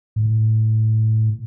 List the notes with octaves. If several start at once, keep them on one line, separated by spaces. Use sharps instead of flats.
A2